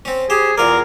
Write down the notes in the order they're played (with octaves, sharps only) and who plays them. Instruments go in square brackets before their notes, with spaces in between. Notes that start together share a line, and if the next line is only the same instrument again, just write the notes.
[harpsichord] C4 C#4
[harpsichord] G4 C5 [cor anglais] G#4
[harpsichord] E2 F4 D5 [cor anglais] A#4